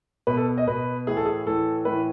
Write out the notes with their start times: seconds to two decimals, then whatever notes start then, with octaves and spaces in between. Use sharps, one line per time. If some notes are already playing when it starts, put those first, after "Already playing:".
0.27 B2 B4
0.37 A4
0.58 D#5
0.67 B2 B4
1.07 A2 E3 G#4
1.17 A4
1.25 G#4
1.46 A2 E3 A4
1.85 A2 E3 B4